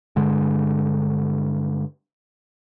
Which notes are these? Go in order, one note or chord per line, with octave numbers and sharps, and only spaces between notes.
G2 D3 G#3